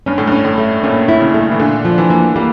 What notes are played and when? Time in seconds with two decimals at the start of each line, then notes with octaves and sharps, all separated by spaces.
0.06 G2 C#4
0.18 A2
0.28 G2 C#4
0.45 A2
0.58 A3
0.83 A#2 C#4
1.08 E4
1.21 C#3
1.34 A3
1.51 E3
1.60 A#2 D3
1.85 F3
1.98 E3
2.10 A#3
2.36 G3 A#3